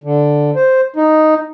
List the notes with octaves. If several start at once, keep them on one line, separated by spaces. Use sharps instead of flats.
D3
C5
D#4